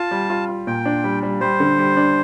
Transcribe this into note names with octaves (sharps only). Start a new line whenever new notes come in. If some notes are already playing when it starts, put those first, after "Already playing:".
Already playing: F4 A5
G3
F4
F4
A#2 G5
D4
G3
G3
G3 C5
D3
G3
D4